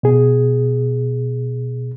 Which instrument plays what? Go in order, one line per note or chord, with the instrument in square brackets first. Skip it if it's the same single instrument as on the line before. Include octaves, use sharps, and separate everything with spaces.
[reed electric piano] B2 G#4